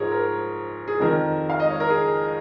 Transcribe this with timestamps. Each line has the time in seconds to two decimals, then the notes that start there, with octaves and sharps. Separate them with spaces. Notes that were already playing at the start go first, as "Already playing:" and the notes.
Already playing: G#2 F3 G#4 A#4 C#5
0.12 A#4
0.88 G#4
1.00 F2 D#3 A#4
1.50 F5
1.60 D#5
1.70 C#5
1.80 A#4
1.90 G#4